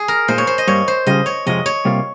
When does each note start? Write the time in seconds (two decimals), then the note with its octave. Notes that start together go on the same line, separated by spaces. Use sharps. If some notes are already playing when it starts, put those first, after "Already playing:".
Already playing: G#4
0.08 A#4
0.28 A#2 G#3 D#4 C5
0.38 C#5
0.47 C5
0.58 D#5
0.68 G2 G3 A#3 C#5
0.88 C5
1.06 C#3 G3 C#4 F4 D#5
1.26 C#5
1.46 F2 C3 F3 G#3 D#5
1.66 C#5
1.85 C3 G3 A#3 F4